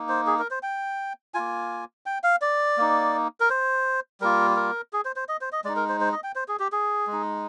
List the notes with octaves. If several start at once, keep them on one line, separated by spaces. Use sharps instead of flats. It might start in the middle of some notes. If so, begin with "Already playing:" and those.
Already playing: A#3 D#4
C5
G#4
A#4
C5
G5
A#3 F4 G#5
G5
F5
D5
A#3 D#4
A#4
C5
G3 A#3 F4 A#4
A#4
G#4
C5
C5
D#5
C5
D#5
G#3 D#4 D5
A#4
C5
C5
D#5
G5
C5
G#4
G4
G#4
G#3
D#4